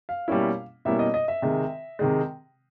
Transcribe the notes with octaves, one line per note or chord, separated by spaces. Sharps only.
F5
B2 G3 A#3 C#4 E4
B2 G3 A#3 C#4 E4 E5
D#5
D#5
E5
C3 D#3 G#3
C3 D#3 G#3